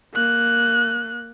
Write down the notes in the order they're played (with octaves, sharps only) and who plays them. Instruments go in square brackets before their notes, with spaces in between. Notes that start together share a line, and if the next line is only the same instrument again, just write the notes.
[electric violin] A#3 F#6